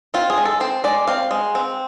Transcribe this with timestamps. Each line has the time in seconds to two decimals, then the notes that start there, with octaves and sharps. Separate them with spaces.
0.14 C4 F4
0.30 G#4
0.38 G#3
0.45 A4
0.60 C4 C5
0.84 G#3 D5
1.07 C4 F5
1.31 G#3
1.55 C4